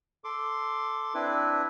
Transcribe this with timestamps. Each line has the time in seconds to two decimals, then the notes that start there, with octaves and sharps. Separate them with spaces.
0.24 A4 C6 D6
1.14 C4 D4 E4 B4